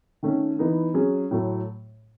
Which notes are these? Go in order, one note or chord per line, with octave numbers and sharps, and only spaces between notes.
D#3 A3 C#4
E3 B3 D#4
F#3 C#4 G#4
A2 F#3 A3